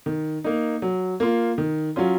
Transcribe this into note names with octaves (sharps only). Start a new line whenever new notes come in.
D#3
A#3 D#4
F#3
A#3 F4
D#3
F#3 C#4 F4